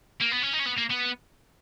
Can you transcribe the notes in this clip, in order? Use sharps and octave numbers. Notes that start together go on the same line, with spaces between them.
A#3
B3
C#4
D#4
C#4
B3
A#3
B3